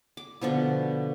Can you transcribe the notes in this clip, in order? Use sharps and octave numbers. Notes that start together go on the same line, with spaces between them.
D6
B2 D3 F3 B3